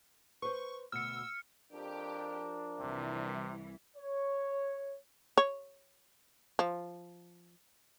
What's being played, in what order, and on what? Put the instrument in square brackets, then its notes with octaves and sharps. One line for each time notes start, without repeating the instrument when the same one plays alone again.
[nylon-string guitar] B4 C5 [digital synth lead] C#6
[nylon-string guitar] D2 B2 [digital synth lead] E6 [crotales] F6 C#7
[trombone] F2 [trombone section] F3 D4 A#4 [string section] G4
[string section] C2 E3 [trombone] C3
[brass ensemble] C#5
[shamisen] C#5
F3